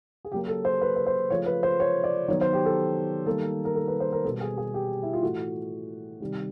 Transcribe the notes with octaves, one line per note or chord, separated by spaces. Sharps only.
G#4
C#3 F#3 A#3 G4
A4
C5
B4
B4
C5
C#3 F3 A3 C#5
B4
C5
C#5
D5
D#3 F#3 B3 C#5
C5
G4
A4
D#3 G3 A#3 A4
A#4
A4
B4
C5
A#4
B2 G3 B3 A4
G#4
G#4
G4
E4
F4
A2 E3 A3 F#4
C3 D#3 G3